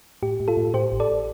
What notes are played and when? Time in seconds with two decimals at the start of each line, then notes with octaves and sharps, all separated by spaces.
0.23 A2 G4
0.40 A2
0.48 F4 A4
0.57 A2
0.74 A2 G4 C5
0.92 A1
1.00 A4 D5